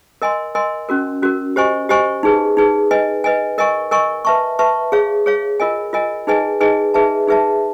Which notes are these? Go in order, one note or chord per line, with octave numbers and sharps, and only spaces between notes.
A#4 D#5 G#5 C6
A#4 D#5 G#5 C6
C#4 F#4 A#4
C#4 F#4 A#4
G4 C5 D#5 G#5 C#6
G4 C5 D#5 G#5 C#6
D#4 G#4 B4
D#4 G#4 B4
B4 D#5 G#5
B4 D#5 G#5
A#4 D#5 G#5 C#6
A#4 D#5 G#5 C#6
B4 E5 A5 C#6
B4 E5 A5 C#6
G#4 C#5 F5
G#4 C#5 F5
F4 A#4 D#5 G#5
F4 A#4 D#5 G#5
D#4 G#4 B4 D#5 G#5
D#4 G#4 B4 D#5 G#5
D#4 G#4 B4 E5 A5
D#4 G#4 B4 E5 A5